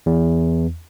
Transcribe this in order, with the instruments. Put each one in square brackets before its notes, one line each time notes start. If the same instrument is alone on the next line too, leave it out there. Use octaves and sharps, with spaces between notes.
[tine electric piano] E2